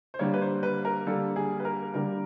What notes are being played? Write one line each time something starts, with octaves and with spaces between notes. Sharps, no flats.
C5
D3 G3 A#3 C#5
B4
C5
B4
A#4
D3 G3 A#3 A4
G#4
B4
A#4
D3 G3 A#3 A#4